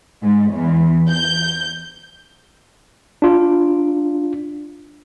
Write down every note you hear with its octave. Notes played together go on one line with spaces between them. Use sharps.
G#2
E2
G6
D4 F4